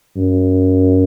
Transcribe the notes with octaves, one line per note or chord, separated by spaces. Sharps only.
F#2